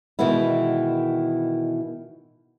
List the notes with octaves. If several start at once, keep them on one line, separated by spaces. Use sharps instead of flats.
B2 D#3 E3 G#3 B3 E4